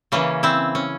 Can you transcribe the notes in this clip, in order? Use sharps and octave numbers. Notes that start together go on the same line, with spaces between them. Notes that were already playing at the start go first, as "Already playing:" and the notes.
C#3 E3 A#3 C#4
C4 E4
C#4